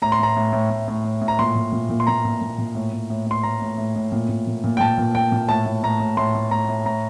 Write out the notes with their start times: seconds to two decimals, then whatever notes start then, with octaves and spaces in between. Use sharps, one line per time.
0.02 A2 A#5
0.12 C6
0.19 A2 A#5
0.37 A2
0.53 A2
0.70 A2
0.88 A2
1.04 A2
1.21 A2
1.28 A#5
1.39 A#2 C6
1.55 A#2
1.72 A#2
1.90 A#2
2.00 C6
2.07 A#2 A#5
2.25 A#2
2.42 A#2
2.58 A#2
2.75 A2
2.93 A2
3.10 A2
3.26 A2 C6
3.43 A2 A#5
3.62 A2
3.78 A2
3.96 A2
4.12 A#2
4.29 A#2
4.47 A#2
4.64 A#2
4.77 G5
4.80 A#2 A5
4.98 A#2
5.15 A#2 G5
5.32 A#2
5.49 A2 A5
5.66 A2
5.83 A2 A#5
6.00 A2
6.17 A2 C6
6.35 A2
6.51 A2 A#5
6.68 A2
6.86 A2 A#5